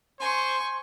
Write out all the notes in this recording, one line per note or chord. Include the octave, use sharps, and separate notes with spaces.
C5 G#5 C6 C#6